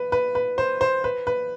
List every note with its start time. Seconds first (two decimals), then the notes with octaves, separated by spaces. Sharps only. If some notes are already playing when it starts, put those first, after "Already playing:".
Already playing: B4
0.12 B4
0.35 B4
0.58 C5
0.81 C5
1.04 B4
1.27 B4